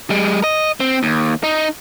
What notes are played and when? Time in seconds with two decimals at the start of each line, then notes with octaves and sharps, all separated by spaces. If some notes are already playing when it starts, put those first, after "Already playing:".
0.10 G3 G#3
0.44 D#5
0.80 C4
1.03 D#2
1.44 D#4